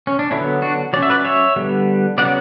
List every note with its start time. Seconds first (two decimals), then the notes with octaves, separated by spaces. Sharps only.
0.07 C#4
0.19 D4
0.31 D3 F#3 B3 C#4 E4
0.62 D4 F#4
0.93 F#3 C#4 D5
1.03 E5
1.10 B4 D5
1.25 C#5 E5
1.56 D3 G3 B3
2.18 C#3 F#3 B3 D5 F#5